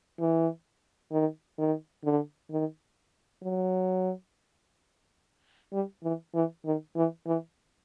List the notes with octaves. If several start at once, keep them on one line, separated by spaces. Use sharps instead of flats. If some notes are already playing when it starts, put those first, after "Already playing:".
E3
D#3
D#3
D3
D#3
F#3
G3
E3
E3
D#3
E3
E3